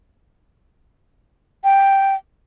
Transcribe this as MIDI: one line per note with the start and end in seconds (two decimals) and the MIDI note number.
1.64 2.15 79